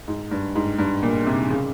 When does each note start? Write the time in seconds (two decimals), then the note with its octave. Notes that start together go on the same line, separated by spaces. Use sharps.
0.08 G#2
0.31 G2
0.55 G#2
0.78 G2
1.03 A#2
1.26 C3
1.50 C#3